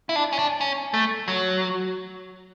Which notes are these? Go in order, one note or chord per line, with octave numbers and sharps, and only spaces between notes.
E4
D4
C#4
D4
C#4
A3
F#3